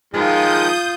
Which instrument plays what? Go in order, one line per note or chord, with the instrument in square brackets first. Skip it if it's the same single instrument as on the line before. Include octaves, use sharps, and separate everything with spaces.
[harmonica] D#3 F3 G#3 [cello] F4 [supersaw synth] D#6 G6